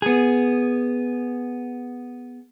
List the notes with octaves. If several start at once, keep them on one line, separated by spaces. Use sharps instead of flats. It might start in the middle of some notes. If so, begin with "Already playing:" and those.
B3 G#4